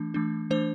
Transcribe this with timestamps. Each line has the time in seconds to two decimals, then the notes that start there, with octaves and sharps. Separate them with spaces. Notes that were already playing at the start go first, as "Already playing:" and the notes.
Already playing: E3 A3 D4
0.14 E3 A3 D4
0.50 E3 A3 D4 C5